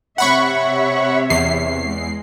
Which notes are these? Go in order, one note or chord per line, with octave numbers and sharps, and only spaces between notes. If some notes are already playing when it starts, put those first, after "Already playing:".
C3 C#5 E5 F#5 B5 C#6
E2 C7
G#3